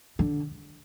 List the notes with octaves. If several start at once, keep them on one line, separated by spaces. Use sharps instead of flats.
D3